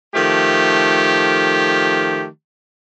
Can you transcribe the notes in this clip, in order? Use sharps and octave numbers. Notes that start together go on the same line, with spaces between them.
D#3 F3 A3 G4